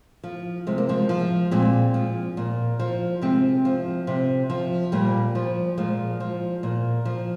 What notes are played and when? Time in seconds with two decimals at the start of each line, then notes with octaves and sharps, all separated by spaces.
0.23 F3
0.67 C3 G#3
0.78 A#3
0.89 F3 G#3
1.09 F3
1.51 A#2 G#3 C4
1.94 F3
2.37 A#2
2.79 F3
3.22 C3 G#3 C4
3.65 F3
4.07 C3
4.50 F3
4.92 A#2 G3 A#3
5.35 F3
5.78 A#2 F3 G#3
6.20 F3
6.63 A#2
7.05 F3